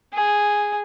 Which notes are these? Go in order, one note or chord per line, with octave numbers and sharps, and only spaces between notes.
G#4